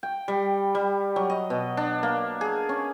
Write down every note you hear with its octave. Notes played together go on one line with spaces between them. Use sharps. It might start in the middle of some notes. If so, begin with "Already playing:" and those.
G5
G3
G3
F#3
D#5
B2
D4
A#3
G#4
C#4